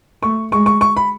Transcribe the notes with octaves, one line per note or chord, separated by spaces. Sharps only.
A3 C#6
G#3 C#6
C#6
C#6
B5